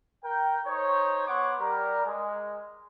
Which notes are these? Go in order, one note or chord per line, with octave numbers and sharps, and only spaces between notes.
A#4 G5
D#4 C5 C#5
B3 C#5 F#5 C6 D6
G3 A#4
G#3